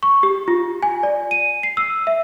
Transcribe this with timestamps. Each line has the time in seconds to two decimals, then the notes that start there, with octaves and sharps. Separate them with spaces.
0.03 C#6
0.23 G4
0.48 F4
0.83 G#5
1.03 D5
1.31 D#7
1.63 C7
1.77 E6
2.07 E5